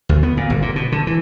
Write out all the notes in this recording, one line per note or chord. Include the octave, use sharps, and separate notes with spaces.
D2
B3
A#2
G1
A#2
B2
D3
E3